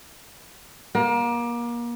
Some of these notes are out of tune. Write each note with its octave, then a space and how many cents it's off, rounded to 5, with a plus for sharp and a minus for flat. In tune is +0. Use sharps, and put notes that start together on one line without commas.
A#3 +30